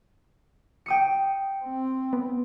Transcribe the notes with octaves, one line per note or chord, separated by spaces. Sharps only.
G5 D#6 C#7
C4
B3